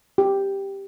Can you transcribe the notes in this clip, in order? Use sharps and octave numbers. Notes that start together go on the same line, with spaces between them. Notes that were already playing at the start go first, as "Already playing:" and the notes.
G4